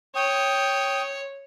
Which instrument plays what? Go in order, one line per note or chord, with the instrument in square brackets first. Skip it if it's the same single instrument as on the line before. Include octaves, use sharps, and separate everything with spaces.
[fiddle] C#5 [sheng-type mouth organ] G5 D#6